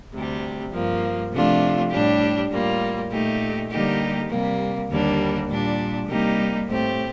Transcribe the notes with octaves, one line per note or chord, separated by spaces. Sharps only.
D2 C3 G3
G2 F3 A#3
C3 F3 A3 D4 F4
A2 G3 D4 G4
A2 G3 A#3 F4
A#2 A3 D#4 G4
D3 G3 A#3 D#4 G4
C3 G3 A#3
D#2 D3 G3 A#3 D4
A#2 G3 D4
C3 G3 A#3 D#4 G4
A2 A3 C4 G4